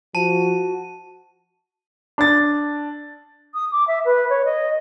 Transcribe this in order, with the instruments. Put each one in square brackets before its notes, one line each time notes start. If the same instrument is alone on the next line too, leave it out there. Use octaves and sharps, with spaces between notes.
[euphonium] F3 [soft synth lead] F#4 [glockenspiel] A5 [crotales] D#7
[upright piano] D4 A6
[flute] D#6
D6
E5
B4
C#5
D#5